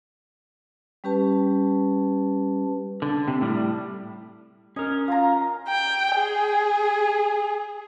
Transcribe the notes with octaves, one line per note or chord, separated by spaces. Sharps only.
G3 C#4 G4 B4 A5
D3
C3
A2 G3
C#4 A#4 D#5
F4 A#5
G5
G#4